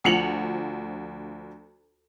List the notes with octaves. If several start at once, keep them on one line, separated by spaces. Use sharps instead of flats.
D2 F3 C#7 F7 F#7